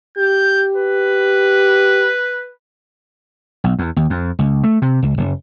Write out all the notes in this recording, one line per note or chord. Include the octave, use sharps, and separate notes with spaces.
G4 G6
B4
B1
E2
D#2
F2
C#2
A3
C3
C#2
F#1